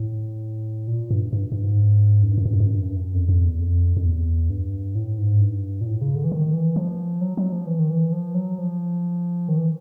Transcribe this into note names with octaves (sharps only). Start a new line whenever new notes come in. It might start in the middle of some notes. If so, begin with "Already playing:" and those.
Already playing: A2
A#2
G2
G2
G2
G#2
F#2
G2
F#2
G2
F#2
G2
F#2
G2
F#2
G2
F#2
F2
F2
E2
F2
F2
E2
G2
A2
G#2
G2
A#2
A2
C#3
D3
E3
D#3
E3
F3
F#3
F#3
F3
E3
D#3
E3
F3
F#3
F3
D#3
E3